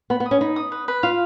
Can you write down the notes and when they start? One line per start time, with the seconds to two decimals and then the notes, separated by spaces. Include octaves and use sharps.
0.10 B3 B5
0.20 B3
0.26 D#6
0.31 C#4
0.41 D#4 B5
0.56 D#6
0.72 B4
0.88 B4
1.03 F4 F5